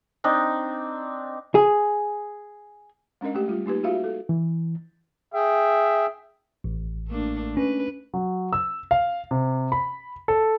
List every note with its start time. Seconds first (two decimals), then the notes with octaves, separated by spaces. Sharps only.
0.24 C4 D4 D#4
1.55 G#4
3.21 G#3 C#4 D4 A#4 D#5
3.35 A3 G4
3.48 G3 F4
3.66 A#3 D#4 G4 B4
3.83 F4 F#4 G#4 E5 F5
4.04 A4
4.29 E3
5.34 G#4 E5 G5
6.64 A1
7.08 A3 A#3 D4
7.57 C#4 B4
8.14 F#3
8.53 E6
8.91 F5
9.31 C3
9.72 B5
10.28 A4